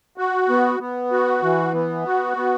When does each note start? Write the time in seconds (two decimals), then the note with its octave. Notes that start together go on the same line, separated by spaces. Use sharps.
0.18 F#4
0.49 B3
0.80 B3
1.11 F#4
1.42 E3
1.74 B3
2.06 F#4
2.37 B3